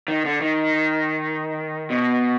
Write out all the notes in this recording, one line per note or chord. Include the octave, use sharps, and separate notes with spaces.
D#3
D3
D#3
B2